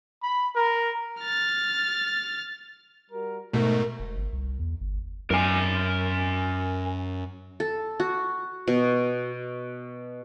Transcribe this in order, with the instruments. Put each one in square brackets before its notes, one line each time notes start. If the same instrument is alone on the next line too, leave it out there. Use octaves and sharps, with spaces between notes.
[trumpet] B5
A#4
[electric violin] F6 A6
[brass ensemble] G3 F#4 A#4
[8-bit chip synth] G#2 B2 A3 [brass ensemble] A#4
[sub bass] E1
G1
C2
E2
G1
[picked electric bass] F#2 [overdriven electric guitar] A#4 G#5
[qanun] A4
F#4
B2